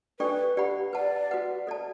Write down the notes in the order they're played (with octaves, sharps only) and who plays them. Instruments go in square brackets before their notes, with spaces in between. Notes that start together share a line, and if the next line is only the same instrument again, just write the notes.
[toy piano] D4 A4 D5 G5 C#6 [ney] B4
[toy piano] G4 D5 F#5 B5
[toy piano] B4 F#5 A5 [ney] D5
[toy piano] F#4 B4 F#5
A4 D5 A5